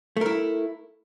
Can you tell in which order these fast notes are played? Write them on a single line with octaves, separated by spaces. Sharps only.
A3 A#4 E4